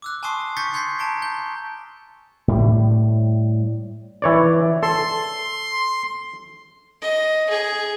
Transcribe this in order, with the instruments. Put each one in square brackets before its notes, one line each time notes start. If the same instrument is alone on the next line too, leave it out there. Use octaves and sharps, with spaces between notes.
[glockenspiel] D6 E6 F#6
G#5 A5 C6 C#6 D#6 C7
C#6 G6 A6 B6 C#7
G#5 C6 G6 G#6 B6 C7
A5 A#5 D7 G7
G6 G7
[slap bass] A2 G3
[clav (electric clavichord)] E3 C#5 D5
[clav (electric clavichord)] A4 [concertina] C6
[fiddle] D#5
G#4